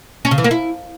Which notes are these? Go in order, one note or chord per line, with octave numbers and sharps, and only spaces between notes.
C#4
C#3
E3
A#3
E4